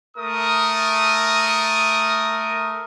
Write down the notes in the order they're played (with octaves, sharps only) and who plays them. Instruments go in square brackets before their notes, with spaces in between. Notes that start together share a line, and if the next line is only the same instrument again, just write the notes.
[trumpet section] A3 A#4 D#6